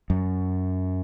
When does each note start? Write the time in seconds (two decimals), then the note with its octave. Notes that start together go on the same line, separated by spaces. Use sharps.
0.10 F#2